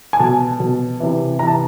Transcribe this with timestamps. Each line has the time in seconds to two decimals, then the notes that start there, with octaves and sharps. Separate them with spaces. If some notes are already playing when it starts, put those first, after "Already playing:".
0.13 G#5
0.20 B2 A5
0.60 B2
1.00 C3 E3
1.39 C3 E3 A#5
1.47 A5